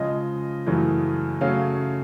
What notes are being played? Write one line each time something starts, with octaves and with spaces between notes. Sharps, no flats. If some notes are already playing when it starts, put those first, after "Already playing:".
Already playing: C#3 F3 G#3 D#5
F#2 C#3 E3 A3
C#3 F#3 A3 C#4 F5